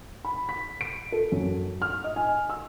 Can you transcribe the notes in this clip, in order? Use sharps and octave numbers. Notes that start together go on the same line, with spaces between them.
B5
B6
D7
A4
F#2
F6
D#5
G#5
E6